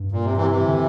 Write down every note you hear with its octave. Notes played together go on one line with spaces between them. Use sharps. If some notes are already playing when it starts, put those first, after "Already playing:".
Already playing: G2
A#2
C3
C3 E3
C3 E3
D3